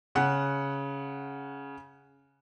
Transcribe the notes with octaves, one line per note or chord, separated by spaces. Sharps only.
C#3 F#5 F#6